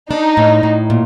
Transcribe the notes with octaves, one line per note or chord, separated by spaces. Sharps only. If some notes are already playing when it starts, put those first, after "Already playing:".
D4 D#4
A2
A2
A#2